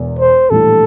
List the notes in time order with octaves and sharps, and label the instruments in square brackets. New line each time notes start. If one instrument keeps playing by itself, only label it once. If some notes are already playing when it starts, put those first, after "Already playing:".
Already playing: [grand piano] E1 E2
[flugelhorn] C5
[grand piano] A#1 A2 E3 G3 [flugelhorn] A4